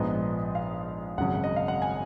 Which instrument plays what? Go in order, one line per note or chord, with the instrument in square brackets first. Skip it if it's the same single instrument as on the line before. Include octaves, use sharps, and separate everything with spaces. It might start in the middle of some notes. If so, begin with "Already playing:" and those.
Already playing: [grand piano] A#1 G#2 F3 B3 D#5
F5
G#1 F#2 C#3 F#3 F#5
D#5
F5
F#5
G#5